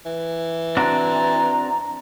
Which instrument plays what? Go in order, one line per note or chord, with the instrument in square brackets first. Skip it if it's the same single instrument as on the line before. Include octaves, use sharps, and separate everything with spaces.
[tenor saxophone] E3
[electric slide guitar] C4 D4 F#4 [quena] A#5